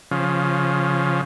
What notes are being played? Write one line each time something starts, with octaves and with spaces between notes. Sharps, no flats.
C#3 F3